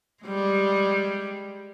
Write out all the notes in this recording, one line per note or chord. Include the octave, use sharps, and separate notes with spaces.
G3 G#3